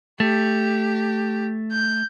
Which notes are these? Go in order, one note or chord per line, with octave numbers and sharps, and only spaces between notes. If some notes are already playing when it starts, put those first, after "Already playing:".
A3 G4
G6